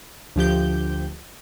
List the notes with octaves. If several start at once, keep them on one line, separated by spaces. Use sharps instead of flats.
D2 F3 G4 G6